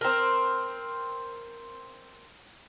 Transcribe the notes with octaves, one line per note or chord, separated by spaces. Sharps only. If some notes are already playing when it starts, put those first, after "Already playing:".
C4 A#4